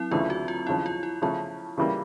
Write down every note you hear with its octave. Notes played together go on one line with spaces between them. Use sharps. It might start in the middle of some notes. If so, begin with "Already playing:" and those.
Already playing: F#3 C4 E4
D2 C#3 E3 A3 F4
F#4
F4
D#2 C#3 F3 E4
F4
E4
C#3 F3 A3 C#4 F4
C#3 E3 G3 A#3